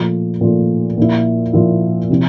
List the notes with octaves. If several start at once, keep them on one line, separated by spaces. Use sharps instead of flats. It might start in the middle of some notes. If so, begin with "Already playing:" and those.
Already playing: A#2 F3 A3
A#2 F3 A3
A#2 F3 A#3 E4
A#2 F3 A#3 E4
C3 F3 C4 E4